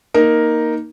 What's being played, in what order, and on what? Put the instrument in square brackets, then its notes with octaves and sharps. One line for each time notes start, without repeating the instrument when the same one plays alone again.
[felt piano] A#3 D#4 A#4